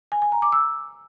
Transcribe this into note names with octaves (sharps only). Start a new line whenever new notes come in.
G#5
G#5
A#5
D6
E6